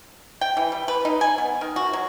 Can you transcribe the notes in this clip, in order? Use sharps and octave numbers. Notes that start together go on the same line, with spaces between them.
G5
E3
G3
B4
D#4
G#5
B3
D#3
F#4
F#3